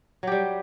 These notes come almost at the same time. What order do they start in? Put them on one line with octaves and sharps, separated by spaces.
F#3 G4 G3